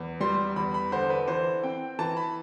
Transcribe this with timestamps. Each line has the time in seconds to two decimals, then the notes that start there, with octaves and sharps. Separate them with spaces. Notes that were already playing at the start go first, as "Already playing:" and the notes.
Already playing: E2
0.20 G3 C6
0.56 E2 B5
0.74 B5
0.92 D3 C5
1.10 B4
1.28 E3 C5
1.63 C4 G5
1.99 E3 A5
2.17 B5